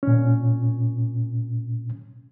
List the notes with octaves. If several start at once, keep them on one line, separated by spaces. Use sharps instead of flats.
A#2 C#4